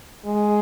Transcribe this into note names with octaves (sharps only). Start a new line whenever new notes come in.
G#3